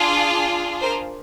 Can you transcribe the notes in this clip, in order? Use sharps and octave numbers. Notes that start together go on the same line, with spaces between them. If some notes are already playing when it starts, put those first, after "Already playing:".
Already playing: D4 F4 G#4
A#4 C5